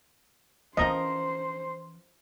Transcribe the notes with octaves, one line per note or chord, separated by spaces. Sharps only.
E3 F3 C#4 A#4 C5 D#5